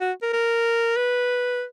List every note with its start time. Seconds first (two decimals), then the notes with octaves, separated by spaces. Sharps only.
0.01 F#4
0.22 A#4
0.33 A#4
0.96 B4